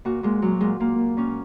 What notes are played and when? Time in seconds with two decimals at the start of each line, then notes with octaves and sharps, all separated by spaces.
0.05 A#2 F#4
0.23 A#2 G#3
0.42 A#2 F#3
0.61 A#2 G#3
0.80 A#2 A#3
0.98 A#2
1.17 A#2 C#4